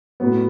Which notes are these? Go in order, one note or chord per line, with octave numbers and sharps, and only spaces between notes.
A2 F#3 B3